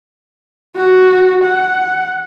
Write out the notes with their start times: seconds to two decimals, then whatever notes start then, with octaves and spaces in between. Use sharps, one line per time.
0.76 F#4
1.44 F#5